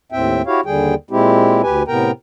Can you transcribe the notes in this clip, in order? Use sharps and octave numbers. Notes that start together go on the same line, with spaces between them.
D#2 A2 C4 E5 G5
E4 F#4 G4 C#5 F5
D#2 D3 G3 G#4 G5
A#2 G#3 C4 E4 G4
D2 G4 B4 G#5
A2 C3 B3 A#4 G5 A#5